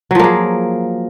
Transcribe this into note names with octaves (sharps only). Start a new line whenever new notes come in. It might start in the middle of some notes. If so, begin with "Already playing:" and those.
F3 F#3 A#3 G#4